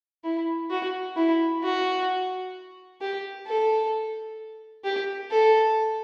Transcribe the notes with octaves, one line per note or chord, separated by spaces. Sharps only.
E4
F#4
E4
F#4
G4
A4
G4
A4